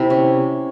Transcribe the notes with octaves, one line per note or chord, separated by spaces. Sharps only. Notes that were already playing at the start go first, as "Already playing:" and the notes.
Already playing: C3 E4
C#4